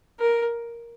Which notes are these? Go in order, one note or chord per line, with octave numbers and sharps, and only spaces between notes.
A#4